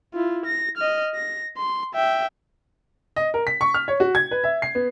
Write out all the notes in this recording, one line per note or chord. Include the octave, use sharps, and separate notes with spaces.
E4 F4
A#6
D#5 F6
A#6
C6
E5 G5
D#5
A#4
B6
C#6
F6
C#5
F#4
G#6
B4
E5
C7
B3